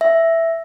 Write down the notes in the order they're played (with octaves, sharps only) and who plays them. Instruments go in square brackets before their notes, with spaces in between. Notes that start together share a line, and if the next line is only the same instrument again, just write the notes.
[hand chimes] E5